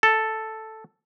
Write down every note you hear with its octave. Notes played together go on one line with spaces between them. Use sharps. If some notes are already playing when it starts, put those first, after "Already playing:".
A4